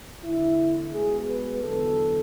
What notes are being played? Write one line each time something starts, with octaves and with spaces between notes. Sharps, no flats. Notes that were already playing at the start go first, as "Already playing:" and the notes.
E2 D3 A3 E4
B2 G#3 B3 G#4
B4
E2 D3 F#3 B3 A4